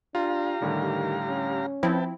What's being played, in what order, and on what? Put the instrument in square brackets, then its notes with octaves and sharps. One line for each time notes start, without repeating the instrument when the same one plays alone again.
[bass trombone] D4 [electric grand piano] F4 [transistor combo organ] G4 F5 A#5
[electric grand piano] A2 D3 G3 [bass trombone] D#3
[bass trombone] C#4
[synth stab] F3 C4 E4 [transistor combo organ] B4 G5 A5